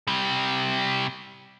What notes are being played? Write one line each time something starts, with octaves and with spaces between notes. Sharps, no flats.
C3 G3